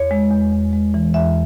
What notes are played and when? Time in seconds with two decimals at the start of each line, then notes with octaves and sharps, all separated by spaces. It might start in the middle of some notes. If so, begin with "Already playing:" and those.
Already playing: E2 C#5
0.11 G#3
0.31 E2
0.53 E2
0.73 G#3
0.94 E3
1.14 E2 E5